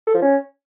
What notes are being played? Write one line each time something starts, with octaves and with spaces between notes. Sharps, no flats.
A4
F3
C#4